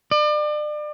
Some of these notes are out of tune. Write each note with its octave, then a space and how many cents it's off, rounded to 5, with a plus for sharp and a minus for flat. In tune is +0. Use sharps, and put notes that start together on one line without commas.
D5 +35